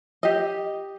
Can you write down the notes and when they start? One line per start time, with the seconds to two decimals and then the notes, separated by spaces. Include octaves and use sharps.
0.23 G4 D#5